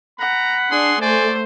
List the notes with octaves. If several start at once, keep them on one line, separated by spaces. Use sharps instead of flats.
F#5 A#5 B5
D4 G#4 C6
A3 C5 D5 G#5